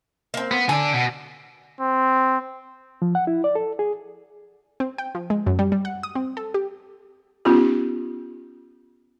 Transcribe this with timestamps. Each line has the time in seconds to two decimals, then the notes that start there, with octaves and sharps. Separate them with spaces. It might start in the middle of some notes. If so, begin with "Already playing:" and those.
0.34 A#3 C4
0.51 B3
0.69 D3 D4 G#5
0.94 B2
1.81 C4
3.02 F3
3.15 F#5
3.27 E4
3.44 D5
3.55 A4
3.79 G#4
4.80 C4
4.98 G5
5.15 F3
5.30 G#3
5.46 F#2
5.59 G3
5.72 G3
5.85 F#5
6.03 D#6
6.15 C4
6.37 A4
6.54 G4
7.45 B3 C#4 D#4 F4 G4